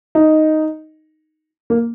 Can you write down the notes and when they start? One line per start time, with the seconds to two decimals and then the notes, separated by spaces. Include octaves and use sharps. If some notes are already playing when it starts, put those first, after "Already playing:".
0.15 D#4
1.70 A#3